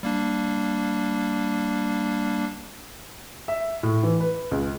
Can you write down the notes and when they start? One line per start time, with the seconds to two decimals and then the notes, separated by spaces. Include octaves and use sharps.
0.03 G3 A#3 D4
3.48 E5
3.83 A2
4.03 E3
4.20 B4
4.51 C#2